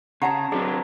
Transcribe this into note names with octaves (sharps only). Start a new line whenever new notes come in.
C#3 G4 F#5 A5 A#5
F#3 C4 D4 G#4